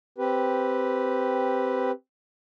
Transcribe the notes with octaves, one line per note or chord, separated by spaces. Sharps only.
C4 G4 B4